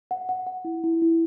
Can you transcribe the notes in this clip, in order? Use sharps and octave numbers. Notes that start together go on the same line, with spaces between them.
F#5
F#5
F#5
E4
E4
E4